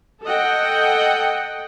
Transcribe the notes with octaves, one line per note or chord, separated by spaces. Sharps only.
A4 D#5 F#5 G5